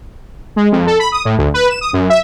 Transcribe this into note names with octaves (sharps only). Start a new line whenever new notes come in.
G#3
F2
A4
B5
D#6
A2
D2
B4
E7
D#6
F#2
E5